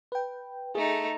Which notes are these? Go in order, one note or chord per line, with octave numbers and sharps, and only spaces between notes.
B4 G5
A3 D#4 G#4 A4